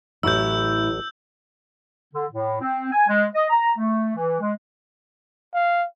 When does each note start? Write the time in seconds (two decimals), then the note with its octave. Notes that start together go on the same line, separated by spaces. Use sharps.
0.23 A1 A2 F#3 E4 E6 G6
2.14 D3
2.32 A2
2.61 C4
2.92 G#5
3.08 G#3
3.35 D#5
3.50 A#5
3.77 A3
4.16 E3
4.41 G#3
5.54 F5